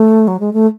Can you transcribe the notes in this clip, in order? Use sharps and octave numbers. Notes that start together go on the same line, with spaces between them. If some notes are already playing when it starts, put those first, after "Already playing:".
Already playing: A3
F#3
G#3
A3